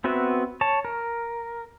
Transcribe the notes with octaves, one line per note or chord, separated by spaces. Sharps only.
B3 C4 F#4 B4 E5
C#5 A5
A#4